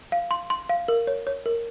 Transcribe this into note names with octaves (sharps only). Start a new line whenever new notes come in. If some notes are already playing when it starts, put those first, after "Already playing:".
F5
C6
C6
F5
A#4
C#5
C#5
A#4